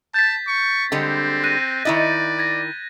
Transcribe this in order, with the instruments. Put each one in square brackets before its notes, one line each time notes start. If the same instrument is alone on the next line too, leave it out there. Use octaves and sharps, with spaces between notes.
[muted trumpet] A5 [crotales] G6 A6 B6
[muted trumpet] C#6
[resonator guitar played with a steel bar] D3 G3 G#3 [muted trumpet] C4
[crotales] F#6 A#6 D#7
[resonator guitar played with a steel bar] D#3 E4 D#5 [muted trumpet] D5
[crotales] G#6 A#6